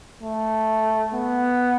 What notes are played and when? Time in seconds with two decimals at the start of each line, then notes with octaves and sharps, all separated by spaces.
0.21 A3
1.14 B3